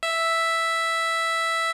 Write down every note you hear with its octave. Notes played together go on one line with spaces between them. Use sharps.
E5